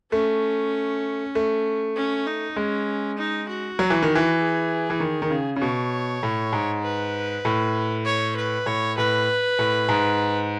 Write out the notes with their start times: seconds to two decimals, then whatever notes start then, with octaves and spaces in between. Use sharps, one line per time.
0.12 A3 C#4
1.35 A3
1.96 C#4
2.27 D#4
2.56 G#3 C#4
3.18 D#4
3.49 F#4
3.79 F#3
3.90 E3
4.02 D#3
4.15 E3
4.40 G#4
4.90 E3
5.00 D#3
5.22 D#3
5.31 C#3
5.56 C#3
5.61 B2 C#5
6.23 A2
6.53 G#2
6.83 B4
7.45 A2
8.06 C#5
8.36 B4
8.66 A2 C#5
8.98 A2 B4
9.59 A2
9.89 G#2